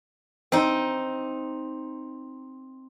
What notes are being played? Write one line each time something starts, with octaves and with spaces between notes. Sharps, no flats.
C4 D#4